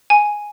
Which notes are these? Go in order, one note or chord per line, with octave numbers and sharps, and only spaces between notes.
G#5